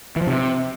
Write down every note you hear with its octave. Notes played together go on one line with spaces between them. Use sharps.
E3
F3
C3